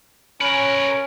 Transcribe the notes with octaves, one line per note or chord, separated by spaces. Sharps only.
C#4 A#4 B4